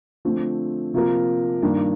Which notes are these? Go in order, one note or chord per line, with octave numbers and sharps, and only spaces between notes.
D3 F3 A3 C4
C3 F3 A#3 F4 A#4
G2 D#3 A#3 D4